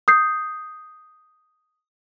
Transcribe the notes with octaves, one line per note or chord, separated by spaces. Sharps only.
D#6 G6 C7